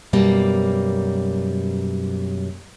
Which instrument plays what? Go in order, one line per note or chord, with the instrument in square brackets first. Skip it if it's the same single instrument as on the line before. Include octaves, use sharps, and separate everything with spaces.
[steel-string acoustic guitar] F#2 B2 G3 A#3